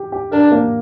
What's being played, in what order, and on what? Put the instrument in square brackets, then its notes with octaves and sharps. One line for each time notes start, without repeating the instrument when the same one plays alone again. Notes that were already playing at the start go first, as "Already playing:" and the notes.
Already playing: [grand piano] G4
G4
[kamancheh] D4 [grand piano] A#4
[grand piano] A#3